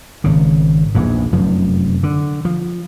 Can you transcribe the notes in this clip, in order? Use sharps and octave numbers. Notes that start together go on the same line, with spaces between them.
G#1 C#3
A#1 E2 G#2
F1 F#2 F3
D3
F3